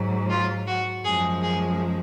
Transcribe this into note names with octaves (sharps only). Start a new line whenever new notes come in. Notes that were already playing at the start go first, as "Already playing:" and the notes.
Already playing: G#2 F#3
F4
F#4
F#2 F3 G#3 G#4
G#4